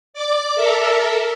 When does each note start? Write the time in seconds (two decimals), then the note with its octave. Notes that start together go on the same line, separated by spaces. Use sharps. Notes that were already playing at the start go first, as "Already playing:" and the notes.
0.14 D5 D6
0.55 A4 A#4 E5